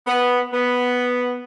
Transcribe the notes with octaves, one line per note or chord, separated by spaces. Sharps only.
B3
B3